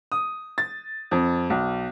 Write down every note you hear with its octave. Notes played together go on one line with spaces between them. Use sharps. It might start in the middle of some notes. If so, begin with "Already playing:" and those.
D#6
A6
F2
B1